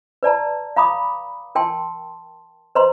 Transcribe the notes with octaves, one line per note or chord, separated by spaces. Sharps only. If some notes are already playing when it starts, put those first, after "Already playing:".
B4 D5 A5 A#5
F5 A#5 B5 D6 D#6
A#4 G5 A5 C6
B4 C5 D#5 A#5 C6